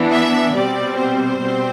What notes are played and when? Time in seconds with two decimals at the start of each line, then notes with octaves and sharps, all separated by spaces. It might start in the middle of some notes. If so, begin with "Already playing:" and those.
Already playing: E3 B3 D4
0.12 E5
0.54 B2 G3 C4 D5
0.97 C5
1.40 B2 G3 C4